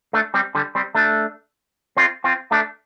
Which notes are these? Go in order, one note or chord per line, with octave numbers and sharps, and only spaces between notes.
A3 D4
G3 C4
D3 G3
G3 C4
A3 D4
C4 F4
C4 F4
A3 D4